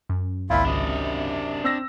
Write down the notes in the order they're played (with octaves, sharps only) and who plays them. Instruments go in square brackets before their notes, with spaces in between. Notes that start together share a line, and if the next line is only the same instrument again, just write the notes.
[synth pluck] F#2
[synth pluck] G#1 C#2 [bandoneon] A#2 E4 F4 [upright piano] F5 B5
[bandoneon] F#2 C3 [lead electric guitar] D4 D#5
[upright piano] C4 E6 A#6